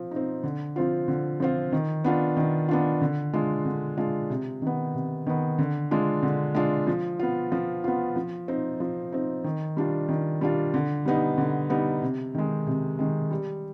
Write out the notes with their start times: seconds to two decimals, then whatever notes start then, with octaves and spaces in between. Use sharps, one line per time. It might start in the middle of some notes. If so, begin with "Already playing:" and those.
Already playing: F3 C4
0.11 C4 D#4
0.44 D3
0.76 F3 C4 F4
1.08 D3
1.40 F3 C4 F4
1.72 D#3
2.04 B3 D4 F4
2.37 D#3
2.69 B3 D4 F4
3.01 D3
3.33 G#3 D4 F4
3.65 D3
3.97 G#3 D4 F4
4.30 C3
4.62 D#3 B3
4.94 C3
5.27 D#3 B3
5.59 D3
5.91 G#3 D4 F4
6.23 D3
6.55 G#3 D4 F4
6.87 F3
7.19 B3 F4
7.52 F3
7.84 B3 F4
8.16 F3
8.48 C4 D#4
8.80 F3
9.12 C4 D#4
9.44 D#3
9.77 G3 D4 F4
10.09 D#3
10.41 G3 D4 F4
10.74 D3
11.06 G3 B3 D#4
11.38 D3
11.70 G3 B3 D#4
12.02 C3
12.35 D#3 G#3
12.67 C3
12.99 D#3 G#3
13.31 G3